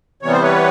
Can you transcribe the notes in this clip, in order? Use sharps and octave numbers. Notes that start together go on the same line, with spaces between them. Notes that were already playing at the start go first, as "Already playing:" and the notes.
C3 E3 G3 B3 C#5
C5
B4 C#5